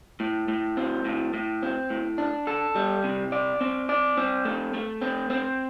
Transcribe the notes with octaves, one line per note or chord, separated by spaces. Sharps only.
A2
A2
C4
A2
A2
C4
A2
D4
A4
G3
C3
D5
C4
D5
C4
A3
A3
C4
C4